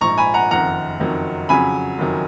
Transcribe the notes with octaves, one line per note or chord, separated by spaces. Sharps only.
A#1 G#2 F3 A#5 C#6
G#5 B5
F#5 A#5
F#1 F2 D#3 F#5 A#5
F#1 F2 D#3 F#3
F2 C#3 F#3 G#5 B5
F#1 F2 D#3 F#3